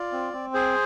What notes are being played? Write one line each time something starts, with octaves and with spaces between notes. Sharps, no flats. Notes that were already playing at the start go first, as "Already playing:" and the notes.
Already playing: F4 D5
C4
C4
G#4 C5